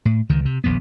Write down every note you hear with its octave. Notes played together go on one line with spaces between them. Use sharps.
A2
C#2 D#3
C3
D#1 A#1 F2 B3